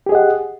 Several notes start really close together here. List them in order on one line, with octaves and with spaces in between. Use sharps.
G4 G#4 D#5 F#5